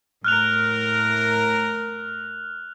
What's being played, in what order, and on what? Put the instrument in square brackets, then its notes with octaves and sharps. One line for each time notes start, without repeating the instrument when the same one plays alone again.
[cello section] A2 A#4 [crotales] F6 F#6 F7